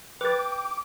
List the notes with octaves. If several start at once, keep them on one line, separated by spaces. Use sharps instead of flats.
B4 G5 D6 A6